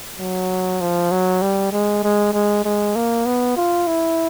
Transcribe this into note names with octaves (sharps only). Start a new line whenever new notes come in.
F#3
F3
F#3
G3
G#3
G#3
G#3
G#3
A#3
B3
F4
E4